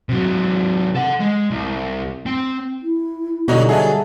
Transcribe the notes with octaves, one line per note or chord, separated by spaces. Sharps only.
C3 F#3
A4 F#5
G#3
C2
C4
E4
B2 D3 F#3 G3 B3 D#4 F#4
F#3 G#4 E5 F#5 A5